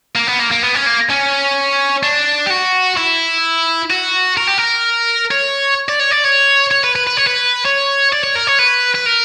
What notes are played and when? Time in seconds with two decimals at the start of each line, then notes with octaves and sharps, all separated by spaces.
0.16 A#3
0.28 B3
0.40 A#3
0.51 A#3
0.63 B3
0.75 C#4
0.86 A#3
1.10 C#4
2.03 D4
2.46 G4
2.50 F#4
2.97 E4
3.91 F#4
4.37 A#4
4.47 G4
4.58 A#4
5.31 C#5
5.89 D5
6.00 C#5
6.12 D5
6.25 C#5
6.71 C#5
6.84 B4
6.95 B4
7.07 B4
7.17 C#5
7.27 B4
7.65 C#5
8.12 D5
8.24 C#5
8.35 A#4
8.47 C#5
8.59 B4
8.94 B4
9.06 A#4